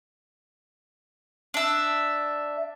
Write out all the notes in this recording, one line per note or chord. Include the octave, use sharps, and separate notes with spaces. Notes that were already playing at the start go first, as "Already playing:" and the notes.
D4 E5